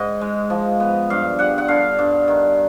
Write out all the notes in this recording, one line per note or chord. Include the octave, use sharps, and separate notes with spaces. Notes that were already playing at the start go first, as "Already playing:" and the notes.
Already playing: G#2 D#5
G#3
F3
B3
G2 F5
G3 F#5
F#5
D3 F5
G2
D#3